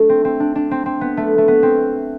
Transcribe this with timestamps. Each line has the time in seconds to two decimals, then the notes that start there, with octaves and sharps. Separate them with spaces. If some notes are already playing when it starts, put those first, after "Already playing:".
Already playing: A3 D4 A4
0.09 C4
0.25 C4
0.40 D4
0.55 D4
0.71 C4
0.86 C4
1.01 B3
1.17 A3
1.38 A3
1.48 B3
1.63 C4